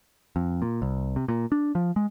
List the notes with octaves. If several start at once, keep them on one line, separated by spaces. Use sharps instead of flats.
F2
A#2
C2
C3
A#2
D4
F3
G#3